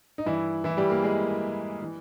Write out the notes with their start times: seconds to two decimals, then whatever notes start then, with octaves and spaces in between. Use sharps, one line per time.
0.18 D#4
0.26 G2 E3 E4
0.64 E3 E4
0.77 G3 G4
0.90 A#3 A#4
1.03 G#3 G#4
1.82 E3